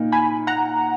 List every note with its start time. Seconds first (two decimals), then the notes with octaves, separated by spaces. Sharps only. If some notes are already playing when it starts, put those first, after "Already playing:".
Already playing: A#2 A#3 D#4
0.12 G#5 B5
0.47 F#5 A#5